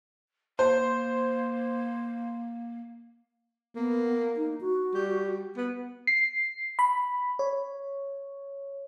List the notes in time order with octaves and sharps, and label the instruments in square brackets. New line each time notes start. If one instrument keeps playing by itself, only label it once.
[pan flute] A#3 [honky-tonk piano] C5
[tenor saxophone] A#3 [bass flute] B3
[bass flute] D#4
F#4
[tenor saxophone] G3
B3
[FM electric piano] C7
B5
C#5